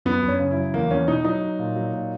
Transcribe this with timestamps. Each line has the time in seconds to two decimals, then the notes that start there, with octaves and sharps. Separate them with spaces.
0.05 F#2 B3
0.23 F#2
0.28 C#4
0.39 C#3
0.51 E4
0.56 F#3
0.74 E2 A#3
0.91 E2 C#4
1.08 B2 D#4
1.25 F#3 D#4
1.41 F#3
1.59 A#2
1.76 F#3
1.93 A#2